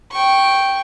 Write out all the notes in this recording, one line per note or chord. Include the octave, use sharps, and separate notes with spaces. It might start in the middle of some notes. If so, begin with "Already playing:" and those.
G5 C#6